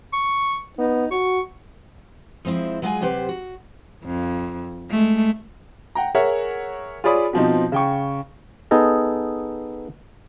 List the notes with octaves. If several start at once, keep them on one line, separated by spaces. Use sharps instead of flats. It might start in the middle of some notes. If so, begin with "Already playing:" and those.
C#6
B3 D#4
F#4 C#6
F3 G#3 C4 E4
F#3 G#3 B3 F4 G#4
C3 F#3 G4 B4 C5
F#4
F2
G#3 A3
F#5 G5 A#5
G#4 A#4 C#5 E5 F#5
F4 G#4 C#5 D5 B5 D#6
B2 F3 C4 D#4
C#3 G5 C#6
B3 D#4 G#4 A4 D#5